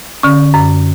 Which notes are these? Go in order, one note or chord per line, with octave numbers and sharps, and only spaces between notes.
D3 C#4
F#2